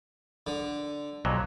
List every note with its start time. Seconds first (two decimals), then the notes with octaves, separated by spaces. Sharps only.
0.47 D3
1.25 B1 F2 A#2 F#3